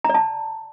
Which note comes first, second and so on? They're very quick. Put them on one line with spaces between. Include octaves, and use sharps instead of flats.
A#5 D5 A5